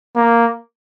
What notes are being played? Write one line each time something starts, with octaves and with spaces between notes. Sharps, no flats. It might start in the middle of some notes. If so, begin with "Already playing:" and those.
A#3